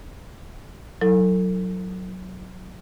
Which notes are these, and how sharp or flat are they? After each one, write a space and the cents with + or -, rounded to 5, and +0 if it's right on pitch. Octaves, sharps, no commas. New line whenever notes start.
F#3 +0 E4 -10 A4 +35